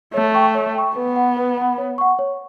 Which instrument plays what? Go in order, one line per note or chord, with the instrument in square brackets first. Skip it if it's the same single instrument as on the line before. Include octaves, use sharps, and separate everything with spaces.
[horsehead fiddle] A3 [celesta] C#5
[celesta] G5 C#6
C#5
G5 C#6
[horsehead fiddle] B3 [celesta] B4
[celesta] F#5 B5
B4
F#5 B5
C#5
F#5 C#6
C#5